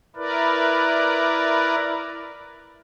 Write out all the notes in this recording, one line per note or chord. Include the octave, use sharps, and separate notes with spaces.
E4 A#4 B4 D5